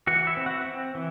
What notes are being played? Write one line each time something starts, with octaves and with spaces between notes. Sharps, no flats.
E3 F#4 F#5
E4 E5
C4
F#4 F#5
C4
E3